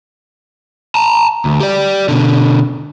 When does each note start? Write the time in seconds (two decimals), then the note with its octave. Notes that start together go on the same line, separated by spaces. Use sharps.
0.95 A5 A#5
1.45 D2
1.60 G4 D5
2.09 B2 D3